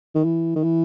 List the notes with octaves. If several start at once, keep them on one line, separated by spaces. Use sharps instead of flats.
D#3
E3
D#3
E3